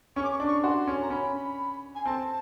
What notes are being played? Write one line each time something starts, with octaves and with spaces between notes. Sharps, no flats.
C#4 C#6
D6
C#6
D4 D6
C#6
F#4 C6
C#4
A#5
C#4 B5
G#5
C4 A5